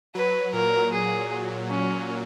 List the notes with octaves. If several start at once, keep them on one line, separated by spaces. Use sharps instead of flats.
F#3 B4
A#2 A#4
G#4
C#4